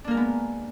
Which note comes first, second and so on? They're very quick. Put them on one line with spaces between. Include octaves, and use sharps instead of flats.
D4 A#3 A#4 G#3 B3